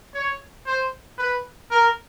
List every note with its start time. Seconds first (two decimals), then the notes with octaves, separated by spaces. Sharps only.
0.14 C#5
0.66 C5
1.18 B4
1.71 A#4